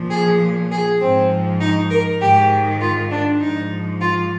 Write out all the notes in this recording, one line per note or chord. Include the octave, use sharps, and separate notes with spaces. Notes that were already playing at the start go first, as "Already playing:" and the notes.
Already playing: A#2 F3
G#4
G#4
G#2 F3 C4
D#4
A#4
G#2 D#3 G4
F4
D4
G#2 F3 D#4
F4